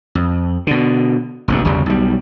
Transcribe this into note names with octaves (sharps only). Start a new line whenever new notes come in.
F2
B2 D3
F1 A#1 G2
G1 E2 C#3 G3
B1 G3